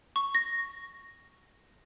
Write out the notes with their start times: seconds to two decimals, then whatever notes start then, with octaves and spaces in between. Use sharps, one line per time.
0.16 C#6
0.35 A#6